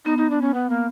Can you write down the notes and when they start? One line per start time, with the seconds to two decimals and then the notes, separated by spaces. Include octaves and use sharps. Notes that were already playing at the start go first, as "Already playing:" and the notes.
0.05 B3 D#4
0.18 D#4
0.30 D4
0.41 C#4
0.54 B3
0.70 A#3